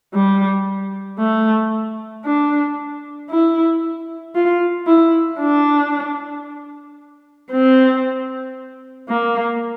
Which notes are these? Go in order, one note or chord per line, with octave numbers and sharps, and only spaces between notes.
G3
A3
D4
E4
F4
E4
D4
C4
A#3